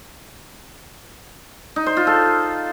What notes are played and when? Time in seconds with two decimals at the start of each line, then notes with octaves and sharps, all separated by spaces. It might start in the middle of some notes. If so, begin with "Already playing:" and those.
1.76 D#4
1.86 C5
1.97 F4
2.07 A4